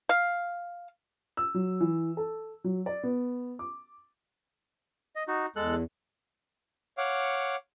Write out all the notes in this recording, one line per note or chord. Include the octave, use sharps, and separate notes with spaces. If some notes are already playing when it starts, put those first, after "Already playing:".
F5
E6
F#3
E3
A4
F#3
D5
B3
D6
D#5
D#4 F#4
E2 G#3 A4 F#6
C#5 F5 F#5 D6